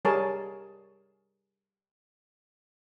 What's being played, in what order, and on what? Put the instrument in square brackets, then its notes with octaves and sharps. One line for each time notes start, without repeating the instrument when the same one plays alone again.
[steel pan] G3 G#4 A#4 C#5 A5